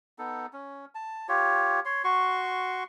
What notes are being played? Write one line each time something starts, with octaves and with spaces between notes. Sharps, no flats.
B3 D#4 A4
C#4
A5
F4 G4 C#5
C#5 C6
F#4 C6 C#6